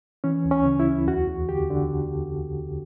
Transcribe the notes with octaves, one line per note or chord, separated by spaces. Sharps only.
E3 C#4
D2
C#4
C#3
E4
D2
E2 F#4
E2
D3 G4
D3